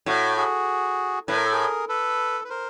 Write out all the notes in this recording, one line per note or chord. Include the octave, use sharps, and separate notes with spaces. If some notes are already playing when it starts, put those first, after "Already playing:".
A2 F#4
F#4 G#4
A2 B4
A#4
A4
G#4 A#4
A4 B4
B4
A#4 C5